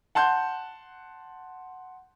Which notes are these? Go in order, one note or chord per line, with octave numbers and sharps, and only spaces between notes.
F#5 A5 C6 G6